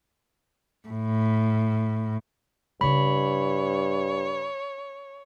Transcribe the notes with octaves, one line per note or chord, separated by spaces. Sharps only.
A2
G2 C#3 E4 C#5 B5